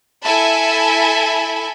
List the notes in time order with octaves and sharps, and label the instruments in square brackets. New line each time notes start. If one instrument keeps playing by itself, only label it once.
[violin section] E4 A4 E5 G#5 A5 B5